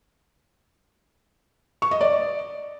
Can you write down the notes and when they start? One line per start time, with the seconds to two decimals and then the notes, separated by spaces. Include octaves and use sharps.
1.82 C#6
1.91 D#5
2.01 D5